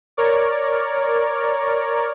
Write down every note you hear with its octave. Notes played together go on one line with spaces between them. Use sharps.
A#4 C#5 D5